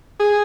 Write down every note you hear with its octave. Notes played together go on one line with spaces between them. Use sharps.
G#4